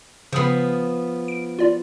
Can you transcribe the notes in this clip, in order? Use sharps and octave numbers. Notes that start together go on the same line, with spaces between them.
C#3 F3 B3 D#6 C7
D7
F4 D5